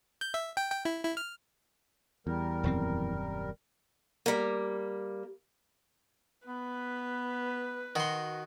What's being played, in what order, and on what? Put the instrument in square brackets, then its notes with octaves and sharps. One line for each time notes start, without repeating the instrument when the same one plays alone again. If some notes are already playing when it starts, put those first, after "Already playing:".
[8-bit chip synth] G6
E5
G5
G5
E4
E4
F6
[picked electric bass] E2 [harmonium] G3 A#4
[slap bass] D#1 F#2 C4
[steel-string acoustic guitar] G3 A#3
[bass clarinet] B3 [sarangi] B4
[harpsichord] D#3 C6 [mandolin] F#4